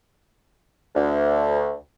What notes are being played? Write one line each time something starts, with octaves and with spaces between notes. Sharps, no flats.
D2